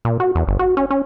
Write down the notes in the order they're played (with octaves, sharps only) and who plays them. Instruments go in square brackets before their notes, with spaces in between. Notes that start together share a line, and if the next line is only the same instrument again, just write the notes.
[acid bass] A#2
F#4
E2
G1
F#4
C#4
C#4